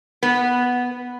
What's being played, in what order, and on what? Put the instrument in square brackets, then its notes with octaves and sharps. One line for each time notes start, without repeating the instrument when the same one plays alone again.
[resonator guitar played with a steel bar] B3